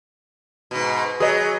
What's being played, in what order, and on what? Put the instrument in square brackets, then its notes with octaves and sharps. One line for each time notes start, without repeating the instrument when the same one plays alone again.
[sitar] G#2 B2
[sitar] F#3 [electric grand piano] G#4 B4 D#5